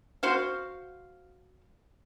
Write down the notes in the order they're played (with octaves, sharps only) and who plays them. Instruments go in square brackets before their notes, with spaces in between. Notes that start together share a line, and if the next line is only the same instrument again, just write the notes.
[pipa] F#4 C5 F5